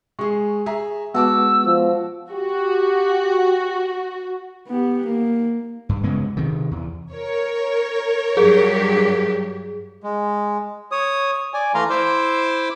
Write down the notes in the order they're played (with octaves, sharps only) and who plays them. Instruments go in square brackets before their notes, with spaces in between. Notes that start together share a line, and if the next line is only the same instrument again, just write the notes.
[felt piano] G#3 G#4 [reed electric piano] C#6
[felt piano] G#4 E5 A#5
[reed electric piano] G#3 B3 [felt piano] F#4 A5 D6 [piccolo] E6
[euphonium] F3
[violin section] F#4 [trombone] G4
[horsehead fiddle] B3 G4
A#3
[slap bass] G2
C#3 G#3 B3
C3 D#3
E2
[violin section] A#4 C#5
[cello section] G2 F#3 G4 [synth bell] G#4
[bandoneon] G#3
C#5 D#6
D5 G#5
E3 A3 F5 A#5 C6
E4 C5 E5 C6 D6 E6